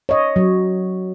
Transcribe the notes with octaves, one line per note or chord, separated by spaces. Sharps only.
C#5 D#5
F#3